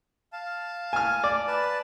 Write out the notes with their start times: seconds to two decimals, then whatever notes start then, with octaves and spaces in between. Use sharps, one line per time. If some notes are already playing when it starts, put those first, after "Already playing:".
0.33 F5 A5
0.93 G#5 F6
1.24 D5
1.47 B4 A5